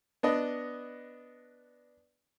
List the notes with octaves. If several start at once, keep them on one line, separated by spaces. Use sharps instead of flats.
B3 D4 D#5